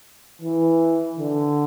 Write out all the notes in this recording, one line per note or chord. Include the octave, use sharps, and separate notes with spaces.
E3
D3